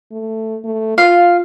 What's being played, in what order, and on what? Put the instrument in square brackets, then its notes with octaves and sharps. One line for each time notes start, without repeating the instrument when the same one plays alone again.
[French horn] A3
A3
[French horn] F4 [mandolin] F5